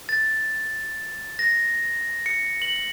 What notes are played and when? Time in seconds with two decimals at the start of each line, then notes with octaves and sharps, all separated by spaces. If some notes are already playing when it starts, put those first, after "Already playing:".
0.09 A6
1.39 A#6
2.26 C#7
2.62 F#7